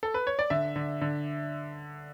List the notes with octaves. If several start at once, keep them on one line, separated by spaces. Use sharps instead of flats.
A4
B4
C#5
D5
D3 E5
D3
D3